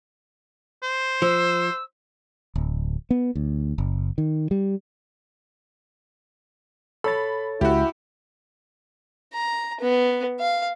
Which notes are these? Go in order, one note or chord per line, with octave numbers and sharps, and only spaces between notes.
C5
F3 E6
D1
B3
D2
F#1
D#3
G3
A4 C#5 B5 A6
C#2 E4 F#4 G4
A#5
B3
F5